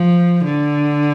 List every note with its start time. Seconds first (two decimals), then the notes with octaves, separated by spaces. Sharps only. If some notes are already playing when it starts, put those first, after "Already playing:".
Already playing: F3
0.44 D3